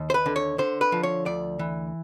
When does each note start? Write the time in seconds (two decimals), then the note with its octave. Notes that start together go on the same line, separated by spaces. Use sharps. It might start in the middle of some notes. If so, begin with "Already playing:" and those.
Already playing: D#2
0.10 C5
0.14 B4
0.26 D3
0.36 C#5
0.58 D3 C5
0.81 B4
0.92 F3
1.03 C#5
1.26 D2 D5
1.59 E3